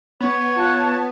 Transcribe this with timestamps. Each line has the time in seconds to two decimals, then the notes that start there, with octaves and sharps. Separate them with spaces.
0.20 B3 C#5
0.56 F4 F5 A5 F#6